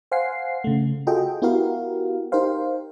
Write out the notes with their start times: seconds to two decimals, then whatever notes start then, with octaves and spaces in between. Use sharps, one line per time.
0.12 C5 F5 F#5 G#5 C7
0.64 C#3 A3
1.07 F4 F#4 G#4 A4 D#5 G5
1.42 B3 E4 F#4 G4 A#4 F5
2.32 D#4 G4 A#4 C5 F5